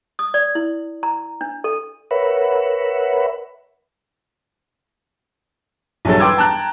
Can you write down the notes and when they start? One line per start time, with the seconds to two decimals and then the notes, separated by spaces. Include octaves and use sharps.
0.19 D#6
0.34 D5
0.55 E4
1.03 A#5
1.41 D4
1.64 A4
2.11 A#4 B4 C#5 E5 F#5 B5
6.05 A#1 G2 F#3 A4
6.20 B4 G5 C6 D6 E6 G#6
6.37 G5 A5 A#5 F#6